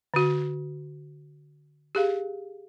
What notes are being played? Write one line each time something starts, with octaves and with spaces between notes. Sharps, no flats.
D3 F#4
G4 G#4 F5